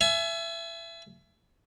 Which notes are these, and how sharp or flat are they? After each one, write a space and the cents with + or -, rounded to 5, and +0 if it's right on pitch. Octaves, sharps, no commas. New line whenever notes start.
E5 +25 G#5 +40